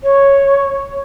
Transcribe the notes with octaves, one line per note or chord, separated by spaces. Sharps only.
C#5